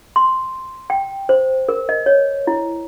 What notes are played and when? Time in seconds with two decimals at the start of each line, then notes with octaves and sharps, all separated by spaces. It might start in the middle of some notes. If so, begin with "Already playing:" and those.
0.16 C6
0.90 G5
1.29 C5
1.69 A#4
1.89 D#5
2.06 C#5
2.47 E4